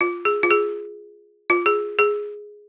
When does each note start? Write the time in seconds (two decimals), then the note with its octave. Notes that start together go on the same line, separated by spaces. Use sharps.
0.01 F4
0.25 G#4
0.43 F4
0.51 G#4
1.50 F4
1.66 G#4
1.99 G#4